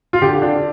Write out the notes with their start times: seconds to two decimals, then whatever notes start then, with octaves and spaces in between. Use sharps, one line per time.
0.13 F4
0.22 D3 G4
0.42 D4